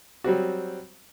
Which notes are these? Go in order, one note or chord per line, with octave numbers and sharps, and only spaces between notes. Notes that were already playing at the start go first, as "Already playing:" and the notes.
F#3 G3 C4 F#4